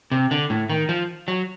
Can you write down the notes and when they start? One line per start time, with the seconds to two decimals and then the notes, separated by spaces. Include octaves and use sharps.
0.12 C3
0.31 D3
0.50 A2
0.70 D#3
0.89 F3
1.28 F#3